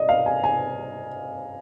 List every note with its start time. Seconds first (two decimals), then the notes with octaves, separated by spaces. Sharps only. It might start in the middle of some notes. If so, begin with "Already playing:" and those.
Already playing: D5 D#5
0.09 F5
0.26 G#5
0.44 G#5